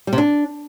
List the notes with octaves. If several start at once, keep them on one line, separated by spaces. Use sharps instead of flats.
G3
C3
D4